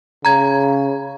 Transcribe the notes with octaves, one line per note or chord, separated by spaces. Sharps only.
C#3 A#5 G#6